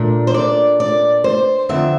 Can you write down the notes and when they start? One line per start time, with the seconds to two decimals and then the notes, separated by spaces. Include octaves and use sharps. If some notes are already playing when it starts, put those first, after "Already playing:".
Already playing: A#2 A3 D4
0.27 C5
0.34 D5
0.80 D5
1.24 C5
1.69 F2 D3 F3 C4 E5